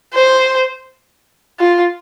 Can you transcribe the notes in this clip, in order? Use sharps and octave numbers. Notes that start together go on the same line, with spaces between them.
C5
F4